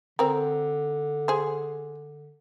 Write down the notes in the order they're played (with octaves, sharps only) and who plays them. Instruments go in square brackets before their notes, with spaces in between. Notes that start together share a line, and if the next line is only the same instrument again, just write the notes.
[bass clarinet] D3 [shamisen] C4 A#4
[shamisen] G#4 C5